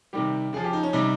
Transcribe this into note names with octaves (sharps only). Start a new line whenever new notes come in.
C3 D#3 G3 G4
C#3 F3 G#4
G4
D#4
C#4
C3 G3 D#4